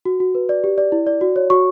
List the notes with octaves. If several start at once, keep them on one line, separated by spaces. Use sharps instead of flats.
F#4
F#4
B4
D5
G4
D5
E4
D5
F#4
C#5
F#4 C#6